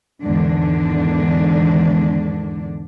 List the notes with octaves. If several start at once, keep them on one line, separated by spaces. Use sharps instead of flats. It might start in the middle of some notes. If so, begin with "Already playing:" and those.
E2 G#2 D3 D#3 D4